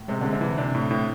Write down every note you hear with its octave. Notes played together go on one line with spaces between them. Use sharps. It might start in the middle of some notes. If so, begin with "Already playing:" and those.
Already playing: A2
C3 G#3
D3 G#3
C3
E3
C3 D4
A2
A2